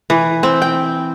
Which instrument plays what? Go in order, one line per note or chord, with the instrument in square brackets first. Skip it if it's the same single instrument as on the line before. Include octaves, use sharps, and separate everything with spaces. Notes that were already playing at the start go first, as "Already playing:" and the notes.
[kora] E3
C4
G5